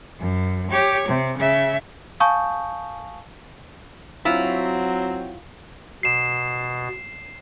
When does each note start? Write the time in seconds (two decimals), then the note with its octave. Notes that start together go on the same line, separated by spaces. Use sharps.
0.19 F#2
0.71 G4 C#5
1.08 C3
1.38 C#3 E5
2.20 F5 G#5 A5 C#6 D#6 G6
4.25 F#3 C4 E4 F4
6.03 B2 C7 E7